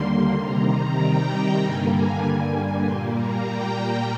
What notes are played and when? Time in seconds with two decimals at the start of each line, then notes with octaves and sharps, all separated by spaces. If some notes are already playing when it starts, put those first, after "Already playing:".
Already playing: D#2 D3 G3 A#3 C6
0.39 C3 D#3 G3 A#5
1.01 G5
1.61 G2 D3 G3 A#3 G#5
1.92 G#5
2.22 G#5
2.83 A#2 G3 A#3 C6
3.14 A#5
3.44 G5